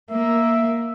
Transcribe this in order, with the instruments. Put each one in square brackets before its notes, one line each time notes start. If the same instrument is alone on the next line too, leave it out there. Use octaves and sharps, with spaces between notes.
[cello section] A#3 [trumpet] E5